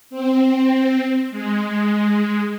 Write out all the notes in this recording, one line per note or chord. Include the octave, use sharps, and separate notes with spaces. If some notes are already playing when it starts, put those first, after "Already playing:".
C4
G#3